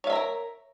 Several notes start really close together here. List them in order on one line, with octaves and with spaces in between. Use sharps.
C#5 F5 E5 A#5 A#4